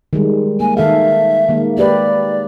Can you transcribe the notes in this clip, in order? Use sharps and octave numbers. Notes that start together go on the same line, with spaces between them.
D#3 G3 G#3
A#3 G#5
D#3 A4 E5 F5
D#3 G#3 A#3
A#3 G4 B4 D5